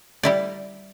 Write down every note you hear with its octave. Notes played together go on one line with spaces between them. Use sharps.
G3 E4 D5